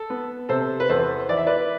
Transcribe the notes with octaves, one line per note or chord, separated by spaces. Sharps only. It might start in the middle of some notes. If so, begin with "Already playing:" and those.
Already playing: A4
B3
C3 A4 C5
B4
E2 A4 C5
E3 D5
E5
B4 D5